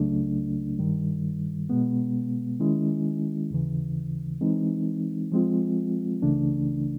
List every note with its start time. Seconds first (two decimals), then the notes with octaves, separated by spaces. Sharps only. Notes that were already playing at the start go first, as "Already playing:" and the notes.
Already playing: C#2 C#3 F#3 A3 D4
0.79 G2 D#3 G3
1.70 B2 G#3 B3
2.59 D#3 G#3 C#4 E4
3.50 D#2 C#3 E3
4.41 E3 G#3 C4 D#4
5.32 F3 G#3 C4 F4
6.22 C#2 C#3 E3 A3 D4